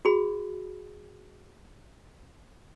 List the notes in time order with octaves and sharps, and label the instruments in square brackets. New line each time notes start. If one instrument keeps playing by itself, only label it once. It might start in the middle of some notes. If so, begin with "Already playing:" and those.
[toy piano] F#4 G#4 B5